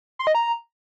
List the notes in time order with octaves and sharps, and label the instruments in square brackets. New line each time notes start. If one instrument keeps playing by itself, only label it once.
[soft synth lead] C6
D#5
A#5